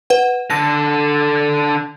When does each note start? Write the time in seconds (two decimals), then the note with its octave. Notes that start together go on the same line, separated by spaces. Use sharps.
0.10 B4 F#5
0.50 D3 A4 A#6